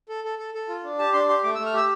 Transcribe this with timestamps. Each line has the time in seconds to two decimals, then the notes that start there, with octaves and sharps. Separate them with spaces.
0.09 A4
0.24 A4
0.39 A4
0.54 A4
0.69 F4
0.84 D4
0.99 G4 A5
1.13 D4 C6
1.29 G4 C6
1.44 A3 D6
1.55 E6
1.59 A3
1.66 F6
1.73 G4 E6